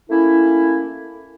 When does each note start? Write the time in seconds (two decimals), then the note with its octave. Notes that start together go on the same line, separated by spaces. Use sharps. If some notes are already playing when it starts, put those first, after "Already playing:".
0.10 A3 A#3 C#4 E4